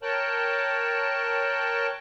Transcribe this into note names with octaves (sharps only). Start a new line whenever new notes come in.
A#4 C#5 G5 A5 F#6